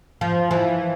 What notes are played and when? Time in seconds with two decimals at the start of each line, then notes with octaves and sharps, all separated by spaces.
0.21 F3
0.51 E3